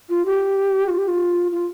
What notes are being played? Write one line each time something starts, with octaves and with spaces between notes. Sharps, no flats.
F4
G4
F4
G4
F4
F4